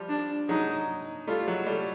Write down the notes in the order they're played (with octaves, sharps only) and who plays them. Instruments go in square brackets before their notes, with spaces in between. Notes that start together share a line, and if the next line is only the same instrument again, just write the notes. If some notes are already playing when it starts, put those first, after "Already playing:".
Already playing: [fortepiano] F3 G3
[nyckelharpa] D4
[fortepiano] F#3 G#3 [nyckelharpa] D#4
[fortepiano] G3 A3 [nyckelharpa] F4
[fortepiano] F#3 G#3
G3 A3